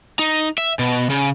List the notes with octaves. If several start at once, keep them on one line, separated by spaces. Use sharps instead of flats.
D#4
E5
B2
C#3